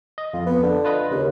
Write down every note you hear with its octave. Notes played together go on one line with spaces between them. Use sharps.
D#5
F2 F4
B3
D3
F4 B4 D#5
D#2 C#3